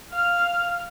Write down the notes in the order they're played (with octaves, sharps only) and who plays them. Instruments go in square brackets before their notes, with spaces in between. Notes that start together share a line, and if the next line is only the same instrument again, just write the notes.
[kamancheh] F5 F6